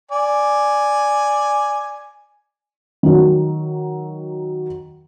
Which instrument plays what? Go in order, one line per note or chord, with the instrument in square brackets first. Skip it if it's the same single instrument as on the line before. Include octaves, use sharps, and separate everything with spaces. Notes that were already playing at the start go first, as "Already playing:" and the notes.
[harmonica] D5 G#5
[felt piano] D#3 F#3